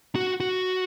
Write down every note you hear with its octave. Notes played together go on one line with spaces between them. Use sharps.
F#4
F#4